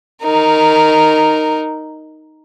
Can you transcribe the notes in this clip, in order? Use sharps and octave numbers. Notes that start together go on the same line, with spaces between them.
D#4 A#4